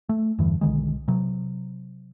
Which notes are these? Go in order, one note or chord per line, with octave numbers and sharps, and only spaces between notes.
A3
E2 G2 D3 E3
B1 D3 D#3 G#3
C3 F#3